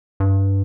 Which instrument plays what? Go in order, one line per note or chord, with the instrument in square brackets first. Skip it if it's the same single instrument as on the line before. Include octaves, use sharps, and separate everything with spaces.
[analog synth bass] G2